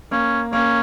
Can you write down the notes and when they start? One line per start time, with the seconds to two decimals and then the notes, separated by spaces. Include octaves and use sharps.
0.11 A#3 C#4
0.53 A#3 C#4